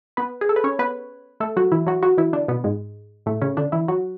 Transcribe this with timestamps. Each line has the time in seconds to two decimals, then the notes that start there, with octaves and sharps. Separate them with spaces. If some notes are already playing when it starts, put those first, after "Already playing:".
0.17 B3 B4
0.41 G#4
0.49 A4
0.56 B4
0.64 C#4 C#5
0.79 B3 B4
1.40 A3 A4
1.56 F#3 F#4
1.72 E3 E4
1.87 F#3 F#4
2.03 F#3 F#4
2.18 E3 E4
2.33 D3 D4
2.48 B2 B3
2.64 G#2 G#3
3.26 A2 A3
3.42 C#3 C#4
3.57 D3 D4
3.72 E3 E4
3.88 F#3 F#4